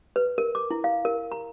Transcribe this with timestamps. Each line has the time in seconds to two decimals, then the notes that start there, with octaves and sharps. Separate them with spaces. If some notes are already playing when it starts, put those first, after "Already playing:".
0.16 B4
0.38 A#4
0.55 D6
0.71 E4
0.84 F5
1.05 A#4
1.32 A#5